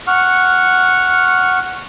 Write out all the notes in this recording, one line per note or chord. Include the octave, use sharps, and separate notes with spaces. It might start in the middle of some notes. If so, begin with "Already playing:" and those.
F#5 C#6 F6